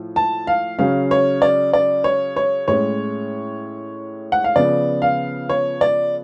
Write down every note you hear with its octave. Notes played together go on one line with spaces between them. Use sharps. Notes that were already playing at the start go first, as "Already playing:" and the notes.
Already playing: A2 F3
A5
F5
C#3 F#3 C#4 F5
C#5
D5
D5
C#5
C#5
A2 G#3 C#4 C#5
F#5
F5
C#3 F3 B3 D5
F5
C#5
D5